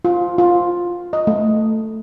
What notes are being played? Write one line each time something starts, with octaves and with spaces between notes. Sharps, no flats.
F4
F4
D#5
A3